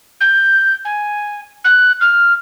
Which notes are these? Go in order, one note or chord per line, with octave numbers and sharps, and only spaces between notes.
G6
G#5
F#6
F6